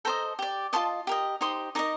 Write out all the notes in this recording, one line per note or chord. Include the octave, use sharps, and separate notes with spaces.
A4 C5 D#5 G5 A#5
G4 D5
F4 C5 D#5 A5 C6
G4 A#4 D#5
D#4 G4 C5 C6 D#6
D#4 A#4 D#5 A#5 D6